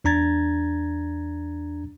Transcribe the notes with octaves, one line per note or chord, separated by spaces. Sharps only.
E2 D4 A#5 G#6 A6